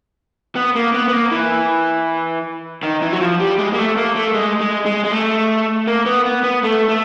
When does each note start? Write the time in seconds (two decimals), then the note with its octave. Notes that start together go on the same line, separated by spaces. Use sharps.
0.56 B3
0.75 A#3
0.94 B3
1.08 B3
1.13 A#3
1.32 E3
2.83 D#3
3.02 E3
3.13 F#3
3.21 F3
3.40 G3
3.59 G#3
3.74 A#3
3.79 A3
3.97 A#3
4.16 A3
4.35 G#3
4.61 G#3
4.86 G#3
5.04 G#3
5.12 A3
5.87 A#3
6.06 B3
6.25 B3
6.43 B3
6.63 A3
6.88 A3